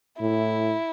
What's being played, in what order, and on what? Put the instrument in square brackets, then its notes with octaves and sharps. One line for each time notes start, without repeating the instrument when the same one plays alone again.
[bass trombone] A2 [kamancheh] E4